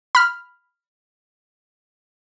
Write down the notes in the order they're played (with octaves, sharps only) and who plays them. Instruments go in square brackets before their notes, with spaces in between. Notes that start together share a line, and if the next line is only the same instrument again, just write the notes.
[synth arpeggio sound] B5 F6